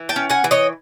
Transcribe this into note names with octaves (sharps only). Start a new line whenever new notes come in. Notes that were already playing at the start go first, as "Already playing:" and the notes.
Already playing: E3
G5 A5
C#4
F#5 G#5
E3
C#5 D#5